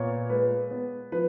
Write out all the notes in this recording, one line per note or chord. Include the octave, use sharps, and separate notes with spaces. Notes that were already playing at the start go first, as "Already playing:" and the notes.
Already playing: A#2 B3 C#5
G#3 B4
B3
F3 B4